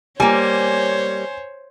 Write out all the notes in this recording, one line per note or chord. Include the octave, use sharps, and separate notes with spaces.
G3 A#3 C5 C#5 G#5